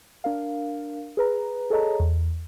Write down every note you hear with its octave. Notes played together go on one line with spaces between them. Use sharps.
D4 A#4 F5
G#4 B4 A#5
G#4 A4 C#5 D#5 A5 A#5
E2